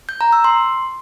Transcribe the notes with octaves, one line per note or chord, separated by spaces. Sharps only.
G6
A#5
E6
C6